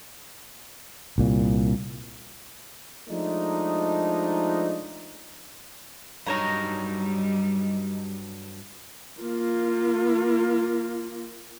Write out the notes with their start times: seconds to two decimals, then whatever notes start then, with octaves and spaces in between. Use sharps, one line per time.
1.18 C2 A#2
3.09 F3 G#3 A3 D4 D#4
6.27 G2 F#3 G3 D#4 A#4 C#5 A#5
9.21 A#3 F4